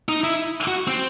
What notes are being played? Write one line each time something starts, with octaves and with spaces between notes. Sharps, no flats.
D#4
E4
F#4
C4